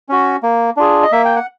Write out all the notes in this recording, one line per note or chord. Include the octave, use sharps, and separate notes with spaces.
C#4 F#4
A#3
D4 F4 G#4
D#5
A#3 E5
G5
F#5